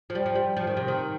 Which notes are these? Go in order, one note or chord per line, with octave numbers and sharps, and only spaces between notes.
F3
G3
F3
G3
F3
D#3
C3
D#3